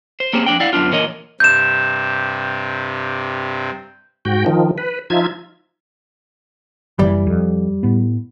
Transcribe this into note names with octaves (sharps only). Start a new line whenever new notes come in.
C5
A#3 C4 C#4 G4 G#4 C5
F2 D4 G5
E4 D5 F5 F#5
F#2 B3 D4 F4
A#2 E3 A#4 C#5 D#5
G2 C3 G6 E7
G#2 F#4 G5
D#3 F3
B4
F3 D#4 F4 E5 G#6
F#1 E3 G3
F2
A2 B3